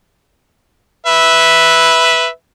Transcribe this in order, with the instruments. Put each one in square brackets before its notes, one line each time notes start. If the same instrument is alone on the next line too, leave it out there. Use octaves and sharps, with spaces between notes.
[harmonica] B4 E5